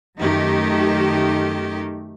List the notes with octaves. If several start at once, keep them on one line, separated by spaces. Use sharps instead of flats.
F#2 D#3 A3 D#4 G4